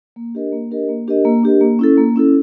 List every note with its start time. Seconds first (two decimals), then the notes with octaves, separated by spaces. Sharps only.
0.16 A#3
0.35 D4 G4 A#4 D#5
0.52 A#3
0.71 D4 G4 A#4 D#5
0.89 A#3
1.08 D4 G4 A#4 D#5
1.25 A#3
1.43 D4 G4 A#4 D#5
1.61 A#3
1.79 C#4 E4 A4
1.98 A#3
2.16 C#4 E4 A4